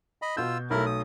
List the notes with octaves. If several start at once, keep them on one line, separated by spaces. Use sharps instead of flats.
D#5 B5
B2 F4 E6 G6
B1 A3 E4 A#4
D#6